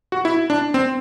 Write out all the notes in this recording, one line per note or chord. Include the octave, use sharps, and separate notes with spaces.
F#4
E4
D4
C4